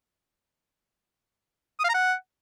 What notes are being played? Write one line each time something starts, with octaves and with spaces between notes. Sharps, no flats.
D#6
F5
A#5
F#5